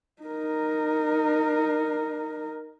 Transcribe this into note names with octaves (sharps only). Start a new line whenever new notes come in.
D#4 A#4